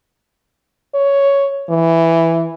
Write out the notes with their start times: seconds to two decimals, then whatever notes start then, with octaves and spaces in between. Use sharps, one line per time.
0.95 C#5
1.70 E3